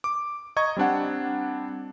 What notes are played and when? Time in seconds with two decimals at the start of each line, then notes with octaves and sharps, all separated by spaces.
0.04 D6
0.57 D#5 A#5 C#6 G#6
0.77 G3 C4 D4 F#5